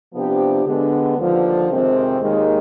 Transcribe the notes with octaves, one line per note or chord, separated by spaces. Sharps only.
C3 F3 B3 D4 G4
D3 G#3 B3
D#2 D3 F3
F2 C3 D#3 G#3 C4
D#2 D#3 G#3